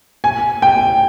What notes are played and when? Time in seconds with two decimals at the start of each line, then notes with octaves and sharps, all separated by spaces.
0.24 G#5
0.62 G5